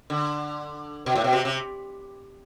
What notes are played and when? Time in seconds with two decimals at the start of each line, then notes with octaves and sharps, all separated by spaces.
0.10 D3
1.06 B2
1.16 A2
1.24 B2
1.33 C3
1.45 C3